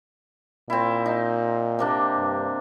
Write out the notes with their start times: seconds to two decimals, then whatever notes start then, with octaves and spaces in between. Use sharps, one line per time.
0.70 A#2 C4 E4
1.06 D#4
1.79 C3 A#3 D4
2.17 G2